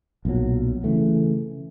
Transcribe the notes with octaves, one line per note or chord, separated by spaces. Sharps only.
B1 A#2 F#3
C#3 E3 A3